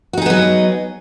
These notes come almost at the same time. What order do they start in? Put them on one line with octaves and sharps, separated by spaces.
F#4 D#4 G#4 B3 F#3